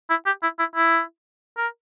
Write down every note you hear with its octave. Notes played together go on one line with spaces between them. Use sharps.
E4
G4
E4
E4
E4
A#4